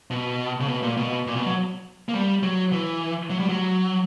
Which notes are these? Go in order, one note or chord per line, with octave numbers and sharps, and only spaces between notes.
B2
C#3
B2
A#2
B2
A#2
B2
F#3
A#3
G3
F#3
E3
F#3
G3
F#3